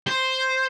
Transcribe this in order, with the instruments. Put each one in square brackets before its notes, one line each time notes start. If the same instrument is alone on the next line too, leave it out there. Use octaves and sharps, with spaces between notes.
[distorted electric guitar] C5